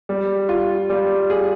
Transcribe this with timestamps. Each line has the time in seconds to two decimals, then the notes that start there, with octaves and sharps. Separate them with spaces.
0.09 G3
0.49 F4
0.90 G3
1.30 G#4